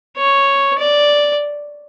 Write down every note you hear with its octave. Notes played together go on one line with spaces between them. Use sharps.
C#5
D5